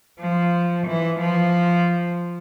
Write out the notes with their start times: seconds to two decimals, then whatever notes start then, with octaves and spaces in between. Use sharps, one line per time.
0.20 F3
0.87 E3
1.20 F3